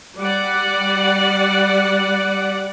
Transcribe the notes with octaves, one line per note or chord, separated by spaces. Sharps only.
G3 D5 F#5